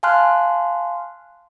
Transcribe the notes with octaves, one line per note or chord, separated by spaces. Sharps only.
F5 G#5 A5 C6 F6 F#6